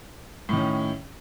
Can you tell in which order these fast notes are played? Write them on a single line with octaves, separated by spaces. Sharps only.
A2 D#3 C#4